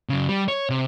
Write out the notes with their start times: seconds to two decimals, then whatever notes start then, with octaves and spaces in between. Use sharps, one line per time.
0.09 F#2 C#3
0.29 G3
0.48 C#5
0.70 C3